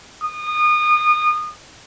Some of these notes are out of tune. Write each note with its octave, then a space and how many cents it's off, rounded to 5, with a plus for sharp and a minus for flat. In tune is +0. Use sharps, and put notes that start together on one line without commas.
D#6 -30